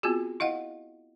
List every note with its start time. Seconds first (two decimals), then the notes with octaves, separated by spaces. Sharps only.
0.03 B3 C4 F4 F#4 G#4
0.40 E4 D#5 F5 F#5